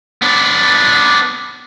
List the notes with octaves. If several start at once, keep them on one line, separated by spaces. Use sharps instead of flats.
B3 D4